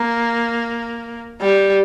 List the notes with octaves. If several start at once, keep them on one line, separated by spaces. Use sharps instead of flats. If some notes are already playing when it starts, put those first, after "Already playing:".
Already playing: A#3
G3